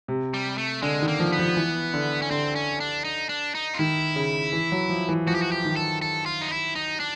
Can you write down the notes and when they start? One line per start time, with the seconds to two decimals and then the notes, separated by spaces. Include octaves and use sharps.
0.08 C3
0.34 G3
0.58 A3
0.82 D3 G#3
1.02 D#3
1.08 A#3
1.19 F3
1.33 B3
1.39 F3
1.57 E3
1.94 D3
2.22 C#4
2.30 D3 C4
2.55 C#4
2.80 D4
3.04 D#4
3.29 D4
3.55 D#4
3.74 F4
3.79 D#3 E4
4.16 C#3
4.53 E3
4.72 F#3
4.90 F3
5.09 E3
5.27 F3 F#4
5.35 G4
5.42 F#4
5.52 G4
5.65 D#3
5.76 A4
6.02 A4
6.26 F4
6.41 D#4
6.51 E4
6.75 D#4
7.00 D4